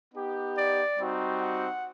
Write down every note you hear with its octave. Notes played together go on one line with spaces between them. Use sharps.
B3 D#4 G4
D5
G3 C4 D#4 F#4
F#5